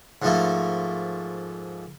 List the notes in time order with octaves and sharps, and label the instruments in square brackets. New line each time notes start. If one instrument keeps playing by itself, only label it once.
[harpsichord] G#2 F3 A3 A#3